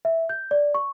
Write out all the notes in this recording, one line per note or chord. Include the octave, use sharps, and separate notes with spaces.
E5
G6
D5
C#6